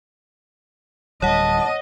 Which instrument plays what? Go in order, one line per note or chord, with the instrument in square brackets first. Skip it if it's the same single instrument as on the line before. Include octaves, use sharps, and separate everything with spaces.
[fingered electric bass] D1 G3 [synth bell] C#5 F#5 [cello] D#5 [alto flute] A5